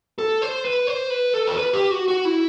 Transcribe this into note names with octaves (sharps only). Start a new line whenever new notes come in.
A4
C5
B4
C5
B4
A4
C5
B4
G4
F#4
F#4
E4